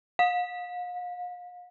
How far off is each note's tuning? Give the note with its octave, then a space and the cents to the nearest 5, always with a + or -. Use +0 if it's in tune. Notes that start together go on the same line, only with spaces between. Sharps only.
F5 +40